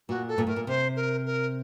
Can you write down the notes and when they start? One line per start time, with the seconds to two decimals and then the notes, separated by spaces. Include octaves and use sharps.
0.09 A#2 F#4
0.28 A4
0.38 A#2
0.47 A2 A#4
0.56 A#2
0.67 C3 C5
0.96 A#4
1.26 A#4